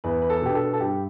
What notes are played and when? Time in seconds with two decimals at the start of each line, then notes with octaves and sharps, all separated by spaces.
0.04 E2 B4
0.22 B4
0.30 A4
0.42 B2 B3 D4 G4
0.55 A4
0.74 A4
0.80 G2 G4